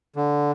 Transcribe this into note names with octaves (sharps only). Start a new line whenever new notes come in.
D3